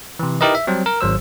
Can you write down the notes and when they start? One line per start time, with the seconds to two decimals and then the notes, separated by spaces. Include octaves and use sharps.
0.19 C3 E3
0.41 D#4 E4 G4 A#4 B4 D#5
0.55 E5
0.67 F#3 G3 C4
0.86 A#4
1.01 G#1 F#3 C5 E6